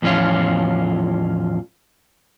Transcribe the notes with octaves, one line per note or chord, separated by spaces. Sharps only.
E2 A2 F3 C#4 F4